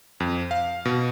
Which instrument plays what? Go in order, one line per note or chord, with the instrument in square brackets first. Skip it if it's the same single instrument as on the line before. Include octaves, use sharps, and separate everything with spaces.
[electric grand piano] F2
F5
B2